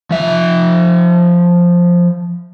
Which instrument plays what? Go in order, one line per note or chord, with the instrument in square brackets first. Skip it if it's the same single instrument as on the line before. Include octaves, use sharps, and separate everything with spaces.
[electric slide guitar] F3 E5